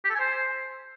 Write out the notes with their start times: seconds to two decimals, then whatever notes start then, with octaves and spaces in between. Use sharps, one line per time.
0.04 G4
0.10 A4
0.15 G#5
0.20 C5